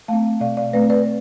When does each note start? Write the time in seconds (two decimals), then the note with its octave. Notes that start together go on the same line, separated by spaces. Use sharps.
0.08 A3 C4 F5 A5
0.41 B2 D5 F5
0.57 D5 F5
0.73 A3 C4 B4 D5
0.90 B4 D5